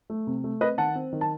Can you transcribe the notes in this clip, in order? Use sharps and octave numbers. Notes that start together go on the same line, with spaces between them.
A3
C3
A3
C4 B4 D#5
D#3 F#5 A5
C4
D#3
A5